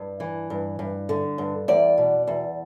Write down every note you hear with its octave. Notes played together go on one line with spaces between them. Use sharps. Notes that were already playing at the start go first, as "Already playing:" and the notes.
Already playing: G2
E3
G2
G2
D3
G2
E2 D5
B2
E2